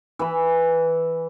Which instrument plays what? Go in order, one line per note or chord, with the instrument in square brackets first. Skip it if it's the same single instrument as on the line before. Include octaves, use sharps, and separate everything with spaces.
[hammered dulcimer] E3 B5